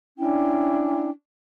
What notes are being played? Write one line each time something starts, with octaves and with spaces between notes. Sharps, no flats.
C#4 D4 E4 G5